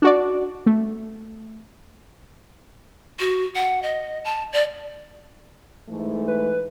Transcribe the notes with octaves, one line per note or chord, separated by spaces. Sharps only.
D4 F#4 D5
A3
F#4
F#5
D#5
A5
D5
G#2 E3 A3
B4